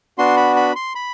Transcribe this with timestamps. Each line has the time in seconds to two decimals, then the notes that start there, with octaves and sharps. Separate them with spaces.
0.18 B3 D4 F#4 C6
0.37 B5
0.56 B5
0.76 C6
0.95 B5